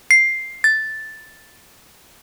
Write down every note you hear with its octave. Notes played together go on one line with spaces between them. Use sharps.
C7
A6